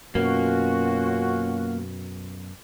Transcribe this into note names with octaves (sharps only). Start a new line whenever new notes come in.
F#2 B2 A#3 C#4 F4 F#4